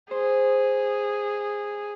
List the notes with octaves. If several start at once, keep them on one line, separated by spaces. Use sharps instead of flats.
G#4 C5